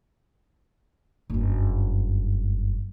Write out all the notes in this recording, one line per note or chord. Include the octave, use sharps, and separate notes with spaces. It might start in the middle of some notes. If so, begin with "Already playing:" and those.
F#1 G2